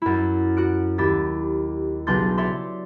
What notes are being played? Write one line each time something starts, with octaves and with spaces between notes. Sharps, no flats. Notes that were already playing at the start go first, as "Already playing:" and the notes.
F#2 E4
F#4 F#6 D7
D#2 E4 G4 A6
B1 C#3 D4 C6 G6 A6
C#5 D5 E5 C6